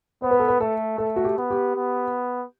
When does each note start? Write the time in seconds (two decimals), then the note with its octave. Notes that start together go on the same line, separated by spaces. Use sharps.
0.22 B3 C5
0.31 B4
0.40 A4
0.48 B4
0.60 A3 A4
0.98 A3 A4
1.16 F#4
1.24 G4
1.38 B3
1.51 G4
1.75 B3